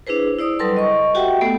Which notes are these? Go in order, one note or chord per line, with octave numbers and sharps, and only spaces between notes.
D4 E4 G#4 B4 C5
E4 C5 D5 D#6
F#3 G3 A4 B4 A5 C6
D#5 C#6
F#4 G4 E5 F#5 G5
A3 B3 A4